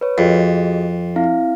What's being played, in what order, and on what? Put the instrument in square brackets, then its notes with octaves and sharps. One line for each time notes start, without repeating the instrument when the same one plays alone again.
[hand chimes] B4 C#5
[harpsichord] F2 [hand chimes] F#4 G#4 D#5
[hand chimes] C4 E4 F5